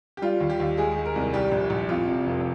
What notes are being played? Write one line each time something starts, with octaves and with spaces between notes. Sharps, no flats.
G4
G3 F4
D#2
G4
D#2
G#3 G#4
G#3
A#4
C2
G3 G4
A#1
A#1
F2 F4
C3
F1